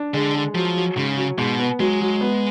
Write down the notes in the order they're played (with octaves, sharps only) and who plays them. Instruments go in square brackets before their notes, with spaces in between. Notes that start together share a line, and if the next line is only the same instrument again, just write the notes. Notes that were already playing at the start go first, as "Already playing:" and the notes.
Already playing: [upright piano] D4
[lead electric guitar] D3 [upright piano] G#3
[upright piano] G#3
[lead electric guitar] F3 [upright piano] F#3
[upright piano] F#3
[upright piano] G#2 [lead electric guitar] C#3
[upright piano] F#3
[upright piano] G#2 [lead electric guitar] B2
[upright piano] B3
[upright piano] F#3 [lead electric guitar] G#3
[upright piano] F#3
B3